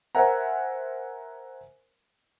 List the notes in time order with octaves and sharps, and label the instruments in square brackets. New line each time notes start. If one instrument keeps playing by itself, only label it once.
[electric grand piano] A#4 C5 E5 F#5 G#5 A#5